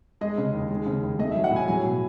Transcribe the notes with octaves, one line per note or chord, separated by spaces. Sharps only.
G#3 D#5
C#3
D#2
G#3
C#3
D#2
A3 D#5
E5
F#3
F#5
A2 G#5
F#3 G#5
B2